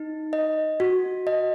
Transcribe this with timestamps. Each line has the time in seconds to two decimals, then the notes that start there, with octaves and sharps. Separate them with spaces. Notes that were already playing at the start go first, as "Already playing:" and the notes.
Already playing: D#4
0.33 D#5
0.80 F#4
1.27 D#5